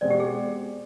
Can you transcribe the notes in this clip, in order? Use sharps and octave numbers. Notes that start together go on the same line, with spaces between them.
B2 G#3 C4 D5
G4
G#4